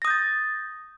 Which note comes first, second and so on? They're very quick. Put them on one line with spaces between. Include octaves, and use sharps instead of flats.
A#6 D#6 G6 A6